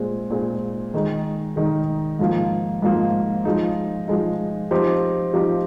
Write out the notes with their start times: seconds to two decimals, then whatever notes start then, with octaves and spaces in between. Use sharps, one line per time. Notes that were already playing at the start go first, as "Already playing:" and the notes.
Already playing: A#2 G#3 C4
0.31 A#2 G#3 C4
0.94 D#3 G#3 D#4
1.56 D#3 G#3 D#4
2.19 G#2 F3 A#3
2.82 G#2 F3 A#3
3.45 F3 G#3 D#4
4.07 F3 G#3 D#4
4.71 F3 C4 D#4 G4 C5
5.34 F3 C4 D#4 G4 C5